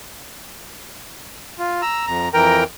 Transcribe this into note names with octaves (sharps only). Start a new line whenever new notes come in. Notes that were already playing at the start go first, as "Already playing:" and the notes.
F4
A#5 E6
F2 A#5
F2 E3 A#4 G5 A#5